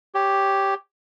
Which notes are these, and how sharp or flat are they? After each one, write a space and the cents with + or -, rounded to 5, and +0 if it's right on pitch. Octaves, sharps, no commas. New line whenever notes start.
G4 +0 C#5 +0